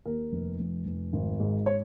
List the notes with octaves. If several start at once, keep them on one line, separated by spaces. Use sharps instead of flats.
D#2 A#4
F1
F1
F1
G#1
G#2
C#5